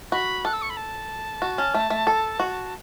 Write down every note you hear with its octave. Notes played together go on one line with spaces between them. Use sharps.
F#4 B5
A4 F#6
E6
C#6
B5
A5
F#4
C#4
A3
A3
A4
F#4